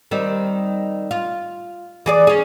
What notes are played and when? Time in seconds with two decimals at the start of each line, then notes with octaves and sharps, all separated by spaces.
0.11 D#3 G3 C4
1.11 F4
2.06 E3 G#4 D5
2.27 C#4 G#4